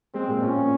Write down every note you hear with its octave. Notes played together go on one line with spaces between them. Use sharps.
G#3 C4
A#2
C#4 F4
A#2